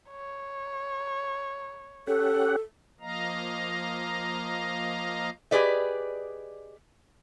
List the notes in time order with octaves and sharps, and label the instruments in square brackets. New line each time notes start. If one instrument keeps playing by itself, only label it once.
[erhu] C#5
[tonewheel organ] C#4 G4 F#5 [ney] A4
[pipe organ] F3 A#3 D#5 F5 A#5
[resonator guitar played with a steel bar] G4 G#4 B4 D5 D#5